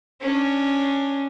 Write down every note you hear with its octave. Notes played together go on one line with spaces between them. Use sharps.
C#4 D4